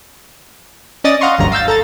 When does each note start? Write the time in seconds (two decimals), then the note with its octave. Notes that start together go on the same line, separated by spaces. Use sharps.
1.04 C#4 D5 D#5 D#6 A6
1.21 D#5 F5 F#5 A#5 C6 C#6
1.39 G1 D2 G2 F#3 A#5
1.52 F5 E6 G6 A6
1.68 A4 A#5 A6